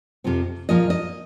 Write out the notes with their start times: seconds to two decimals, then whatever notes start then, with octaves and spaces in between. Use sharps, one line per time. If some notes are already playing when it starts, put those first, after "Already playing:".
0.24 F2 C3 F3 C4
0.69 A#2 F3 A#3 D#5
0.90 D#5